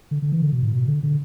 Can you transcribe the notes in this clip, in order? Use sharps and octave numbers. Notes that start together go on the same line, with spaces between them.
D3
D3
E3
D3
B2
A2
B2
D3
D3